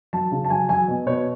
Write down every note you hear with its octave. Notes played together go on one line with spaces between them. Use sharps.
F#3 A5
C#3
A5
F#3 G#5
F#3 G#5
B2
B2 C#5